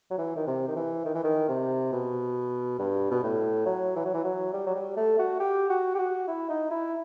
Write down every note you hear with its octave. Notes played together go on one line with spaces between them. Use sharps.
F#3
E3
D#3
C3
D#3
E3
D#3
E3
D#3
C3
B2
G2
B2
A2
F#3
E3
F#3
E3
F#3
G3
F#3
G3
A3
F#4
G4
F#4
G4
F#4
E4
D#4
E4